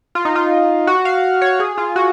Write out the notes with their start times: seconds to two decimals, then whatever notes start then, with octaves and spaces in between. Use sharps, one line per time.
0.15 F4
0.25 D#4
0.36 F4
0.87 F#4
1.05 F5
1.42 C#5
1.60 G#4
1.78 F4
1.96 F#4